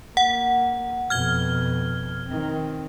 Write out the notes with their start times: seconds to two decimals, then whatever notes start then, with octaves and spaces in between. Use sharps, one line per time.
0.17 A#3 F#5
1.10 F2 B2 F6 G#6 G7
2.28 D#3 C4